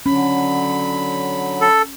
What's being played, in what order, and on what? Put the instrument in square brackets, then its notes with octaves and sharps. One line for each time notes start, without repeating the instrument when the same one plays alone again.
[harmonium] D3 F#3 [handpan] C#4 [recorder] B5
[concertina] A4